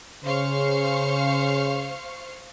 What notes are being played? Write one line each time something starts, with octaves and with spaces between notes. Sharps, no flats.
C#3 C5 F5 C#6